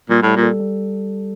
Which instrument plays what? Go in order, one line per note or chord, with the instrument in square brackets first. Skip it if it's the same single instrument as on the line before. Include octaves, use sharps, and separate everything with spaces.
[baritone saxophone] A#2 [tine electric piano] G3
[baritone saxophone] A2 [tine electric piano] G3
[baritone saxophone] A#2
[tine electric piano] A4
G3